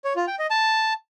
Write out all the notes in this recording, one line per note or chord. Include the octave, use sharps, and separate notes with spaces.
C#5
F4
G5
D#5
A5